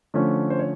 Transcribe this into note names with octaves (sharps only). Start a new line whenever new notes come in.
D3 F3 A3 C#4
C5
C#5